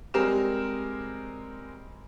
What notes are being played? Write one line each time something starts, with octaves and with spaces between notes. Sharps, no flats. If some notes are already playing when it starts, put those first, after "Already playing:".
G3 G#3 C4 A#4 F6 E7